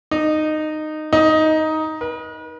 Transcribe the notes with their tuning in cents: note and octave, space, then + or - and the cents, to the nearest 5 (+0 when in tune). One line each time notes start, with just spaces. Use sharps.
D#4 -15
D#4 +10
B4 -45